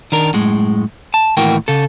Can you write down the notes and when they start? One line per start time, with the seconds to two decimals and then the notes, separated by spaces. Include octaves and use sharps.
0.12 D#3 D4 A#4
0.33 F#2 A2 G#3
1.14 A5
1.37 D#2 A2 E3 F#4 A#4 G5
1.68 C#3 A4